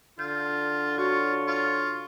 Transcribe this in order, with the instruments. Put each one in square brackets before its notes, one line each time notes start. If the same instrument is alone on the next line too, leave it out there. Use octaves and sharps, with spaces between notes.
[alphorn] D3 [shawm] F4 [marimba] G6
[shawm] F4 [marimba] F#4 [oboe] C#5
[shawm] F4